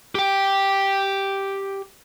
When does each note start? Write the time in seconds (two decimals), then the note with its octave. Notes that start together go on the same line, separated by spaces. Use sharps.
0.15 G4 G5